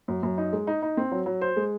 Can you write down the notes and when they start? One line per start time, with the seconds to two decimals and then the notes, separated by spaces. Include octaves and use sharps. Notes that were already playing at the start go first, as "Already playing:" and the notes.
0.08 F#2
0.23 F#2
0.38 D#4
0.53 G#3
0.67 D#4
0.82 D#4
0.97 C4
1.12 F#3
1.26 F#3
1.41 C5
1.56 G#3